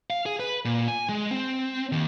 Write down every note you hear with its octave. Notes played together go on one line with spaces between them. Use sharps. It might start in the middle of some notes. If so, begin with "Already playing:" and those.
F5
G#4
B4
A#2
G#5
G#3
C4
D#2